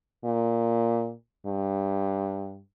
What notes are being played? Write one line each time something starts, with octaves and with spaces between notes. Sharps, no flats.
A#2
G2